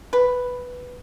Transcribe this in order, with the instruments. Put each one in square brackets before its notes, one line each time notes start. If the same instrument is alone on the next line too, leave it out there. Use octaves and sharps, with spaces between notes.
[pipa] B4